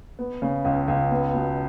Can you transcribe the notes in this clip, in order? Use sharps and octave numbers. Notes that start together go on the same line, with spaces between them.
B3
C#3
C#2
C#2
B3
B2